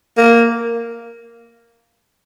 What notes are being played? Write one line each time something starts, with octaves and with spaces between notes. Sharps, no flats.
A#3